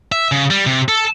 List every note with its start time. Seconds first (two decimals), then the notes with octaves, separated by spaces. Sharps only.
0.12 E5
0.32 C#3
0.50 G3
0.66 C3
0.88 A4